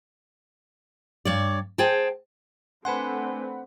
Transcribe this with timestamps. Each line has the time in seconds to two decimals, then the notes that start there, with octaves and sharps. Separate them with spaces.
1.25 G2 C#5 D5
1.78 G#4 C5 G5 A5
2.85 A3 C4 D4 B4 F#5 G#5 B5 C6